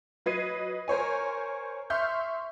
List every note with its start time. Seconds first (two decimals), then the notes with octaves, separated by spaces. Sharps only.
0.26 F#3 B4 D#5 G#6 C7 D#7
0.88 A#4 C5 C#5 G#5
1.90 E5 C6 C#6 F6 G6